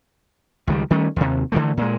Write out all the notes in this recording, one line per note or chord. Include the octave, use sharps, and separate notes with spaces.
C#2 D#3 F#3 G3
D#3 G3 A3 C#4
D#2 C3
D3 E3 A3
A#2 G#3